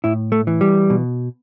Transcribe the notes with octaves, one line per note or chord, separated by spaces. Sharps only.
A2 E4
A3
E3
G3
B2